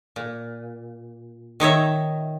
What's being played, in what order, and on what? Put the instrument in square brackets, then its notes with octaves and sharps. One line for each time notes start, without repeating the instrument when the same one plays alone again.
[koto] A#2
D#3 D#4 C#5 E5